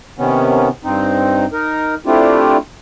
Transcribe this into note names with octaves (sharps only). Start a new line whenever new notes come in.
C3 D#3 B3 C#4
G2 C4 D#4
D#4 A#4
A3 C4 D4 E4 F4 G4